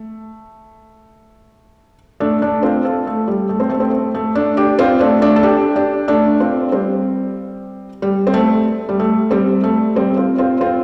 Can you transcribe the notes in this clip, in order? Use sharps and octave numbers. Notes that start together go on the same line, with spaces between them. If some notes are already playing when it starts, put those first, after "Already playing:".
Already playing: A3
A3 D4
A3 D4
C4 F4
F4 A4
A3
G3
A3
C4
A3
C4
A3
A3
A3 D4
D4 G4
C4 F4
A3 D4
A3 D4
A4
D4 G4
D4 G4
A3 D4
C4 F4
G3 C4
G3
C4
A3
G3
A3
G3 C4
A3
G3 C4
C4 F4
C4 F4
C4 F4